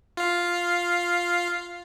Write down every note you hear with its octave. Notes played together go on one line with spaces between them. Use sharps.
F4 F5